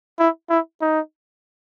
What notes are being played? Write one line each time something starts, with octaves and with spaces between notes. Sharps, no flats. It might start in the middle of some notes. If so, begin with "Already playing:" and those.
E4
E4
D#4